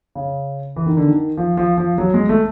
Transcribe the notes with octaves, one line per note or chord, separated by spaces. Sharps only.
C#3
E3
D#3
D3
D#3
F3
F3
F3
F#3
G#3
A3